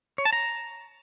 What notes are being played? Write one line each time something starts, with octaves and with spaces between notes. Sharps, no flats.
C#5
A5
A#5